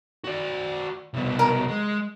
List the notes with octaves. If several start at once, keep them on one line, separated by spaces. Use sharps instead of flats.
F#4 D5
C2 B2
A#4
G#3